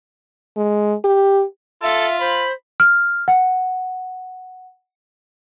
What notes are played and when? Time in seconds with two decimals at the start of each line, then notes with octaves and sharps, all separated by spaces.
0.57 G#3
1.04 G4
1.83 F4 A4 E5
2.20 C5 B5
2.80 F6
3.28 F#5